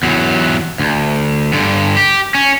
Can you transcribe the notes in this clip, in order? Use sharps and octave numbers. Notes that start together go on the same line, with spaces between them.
E2 F#3
D2
G2 D3
G4
C#4